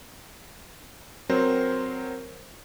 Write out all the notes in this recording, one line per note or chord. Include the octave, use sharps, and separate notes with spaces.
F#3 C4 A#4 C5